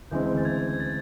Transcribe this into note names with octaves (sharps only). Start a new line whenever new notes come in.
D2 C#3 E3 G#3 C4 G6
A6
G#6
A6